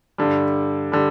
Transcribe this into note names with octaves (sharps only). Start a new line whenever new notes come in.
G2 D3 G3
D3 G3